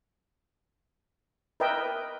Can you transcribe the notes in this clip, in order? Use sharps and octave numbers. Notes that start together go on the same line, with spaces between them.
A#4 B4 D#5 E5 G5